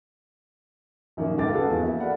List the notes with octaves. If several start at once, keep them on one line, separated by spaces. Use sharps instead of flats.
A#1 F#2 D#3 A#3
C#2 A4 F5 D6 A6
F#4 G#4 A4 B4 F5 F#5
E2
A#3 F#4 G#4 E5
A4 D5 F5 F#5 B5